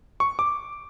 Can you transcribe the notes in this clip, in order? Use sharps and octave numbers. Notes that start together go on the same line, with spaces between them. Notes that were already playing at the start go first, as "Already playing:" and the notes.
C#6
D6